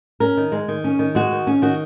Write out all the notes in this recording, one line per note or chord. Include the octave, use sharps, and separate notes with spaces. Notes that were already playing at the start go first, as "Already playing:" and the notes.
C#4 A#4
D#3
G#3
D#3
C#4
D#3
G#3 F#4
D#3
C#4
D#3 F#4